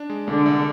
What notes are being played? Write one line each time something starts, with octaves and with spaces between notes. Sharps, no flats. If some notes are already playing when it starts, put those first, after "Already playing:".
Already playing: D4
G#3
C2 D3 D4
C2